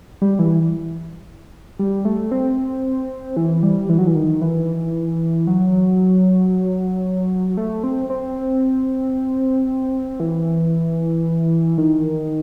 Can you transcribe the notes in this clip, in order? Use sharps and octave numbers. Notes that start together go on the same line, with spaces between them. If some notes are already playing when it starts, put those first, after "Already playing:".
G3
E3
G3
A3
C4
E3
G3
E3
F#3
E3
D#3
E3
F#3
A3
C4
C4
E3
D#3